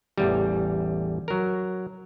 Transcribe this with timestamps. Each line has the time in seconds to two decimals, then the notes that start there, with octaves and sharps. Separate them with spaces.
0.18 A1 E2 G3
1.28 F#3 A#4